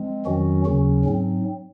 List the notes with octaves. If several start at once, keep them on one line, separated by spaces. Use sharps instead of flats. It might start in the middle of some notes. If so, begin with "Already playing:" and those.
Already playing: F3 G#3 C4
F2 D#3 F#3 C#4 F#4
D#2 C#3 F#3 C#4
G#2 F#3 C4